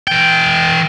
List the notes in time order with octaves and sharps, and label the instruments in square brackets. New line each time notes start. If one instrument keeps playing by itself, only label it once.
[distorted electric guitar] E3 G5